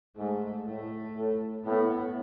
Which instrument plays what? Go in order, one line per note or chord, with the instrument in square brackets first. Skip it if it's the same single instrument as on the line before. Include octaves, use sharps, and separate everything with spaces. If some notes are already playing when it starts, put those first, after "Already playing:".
[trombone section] G#2 [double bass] A3
[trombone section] A2 [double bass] A3
[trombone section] A2
[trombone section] A2 [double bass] B3